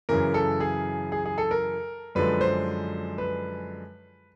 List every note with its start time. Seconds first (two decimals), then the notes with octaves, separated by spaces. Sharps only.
0.09 F#2 C#3 E3 A#4
0.34 A4
0.60 G#4
1.12 G#4
1.26 G#4
1.38 A4
1.51 A#4
2.15 F#2 D3 F3 G#3 B4
2.41 C5
3.18 B4